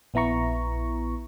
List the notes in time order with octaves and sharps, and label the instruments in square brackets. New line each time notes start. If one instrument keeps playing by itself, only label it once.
[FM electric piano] A#1 B3 E4 A#5 C#6